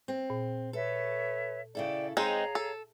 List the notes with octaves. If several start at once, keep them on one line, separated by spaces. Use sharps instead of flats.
C4
A#2
A4 B4 C#5 E5
C#3 E4 A4 D5 G5
G#3 C4 D#4 G#4 C#5 F5 A#5
A4